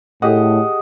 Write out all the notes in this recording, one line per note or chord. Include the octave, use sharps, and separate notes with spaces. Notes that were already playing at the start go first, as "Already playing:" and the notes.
A2 G4 G#4 D#5 F#5